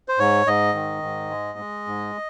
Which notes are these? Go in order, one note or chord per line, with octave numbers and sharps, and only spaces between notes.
C5
G#2 C#5
G#2 D#5
D#3
G#2
G#3
G#3
G#2